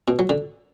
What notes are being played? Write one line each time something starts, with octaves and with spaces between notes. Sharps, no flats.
B2
F#3
D3